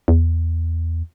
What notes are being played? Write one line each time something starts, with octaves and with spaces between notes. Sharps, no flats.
E2